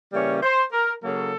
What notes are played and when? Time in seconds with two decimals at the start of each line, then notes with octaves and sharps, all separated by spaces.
0.13 C#3 E3 G3 A#3 C#4 C#5
0.43 C5
0.73 A#4
1.03 C#3 F#3 A#3 A4